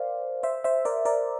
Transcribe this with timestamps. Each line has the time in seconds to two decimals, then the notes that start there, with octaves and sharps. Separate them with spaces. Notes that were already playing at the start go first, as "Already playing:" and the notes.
Already playing: A#4 C5 D5 F5
0.43 C5 E5
0.64 C5 E5
0.85 A#4 D5
1.05 A#4 D5